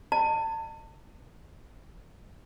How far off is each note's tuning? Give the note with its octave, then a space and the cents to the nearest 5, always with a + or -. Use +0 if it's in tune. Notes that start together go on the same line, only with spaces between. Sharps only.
D#5 -40 A5 +35